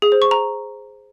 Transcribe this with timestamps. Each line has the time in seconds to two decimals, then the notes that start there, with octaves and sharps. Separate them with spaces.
0.02 G#4
0.12 C5
0.22 C#6
0.31 A#5